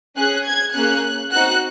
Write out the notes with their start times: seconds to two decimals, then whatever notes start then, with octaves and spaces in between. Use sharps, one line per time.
0.17 C#4 G#4 F#6
0.45 G#6
0.75 A#3 C#4 G#4 F#6
1.32 C4 D#4 F#4 F#6